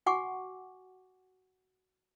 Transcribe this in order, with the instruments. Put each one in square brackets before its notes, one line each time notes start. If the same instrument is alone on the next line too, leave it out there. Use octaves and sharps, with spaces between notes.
[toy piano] F#4 F#5 G#5 C#6 D6